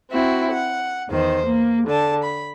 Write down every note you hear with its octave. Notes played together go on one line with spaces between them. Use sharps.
C4 E4 F#4
F#5
E2 D#3 C5
A#3
D3 A5
B5